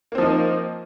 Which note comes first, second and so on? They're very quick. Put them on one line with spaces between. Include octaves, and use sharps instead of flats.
A#3 C4 F3 D#4